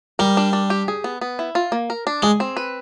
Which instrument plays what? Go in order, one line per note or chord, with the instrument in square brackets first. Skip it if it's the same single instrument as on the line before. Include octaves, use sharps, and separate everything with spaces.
[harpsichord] G3 [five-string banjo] A#4
[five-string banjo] D4
D4
G4
G#4
B3
B3
E4
F4
A#3
A#4
D4
[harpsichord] G#3 [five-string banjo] G#4
[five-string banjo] C4
B4